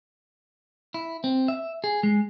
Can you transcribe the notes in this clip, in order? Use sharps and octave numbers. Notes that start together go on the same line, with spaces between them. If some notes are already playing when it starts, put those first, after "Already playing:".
E4
C4
E5
G#4
G#3